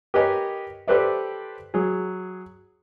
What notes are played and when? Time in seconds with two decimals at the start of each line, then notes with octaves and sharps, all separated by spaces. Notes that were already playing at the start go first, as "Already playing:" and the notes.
0.14 G4 A#4 B4 C#5 D#5 G#5
0.88 G4 A4 B4 C5 D5 E5
1.74 F#3 G#4